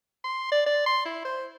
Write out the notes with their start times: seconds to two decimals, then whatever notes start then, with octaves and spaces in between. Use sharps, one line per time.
0.24 C6
0.52 D5
0.66 D5
0.86 C6
1.05 E4
1.25 C5